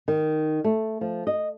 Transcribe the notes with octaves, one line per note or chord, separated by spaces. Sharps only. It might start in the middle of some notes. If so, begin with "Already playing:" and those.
D#3
A3
F3
D#5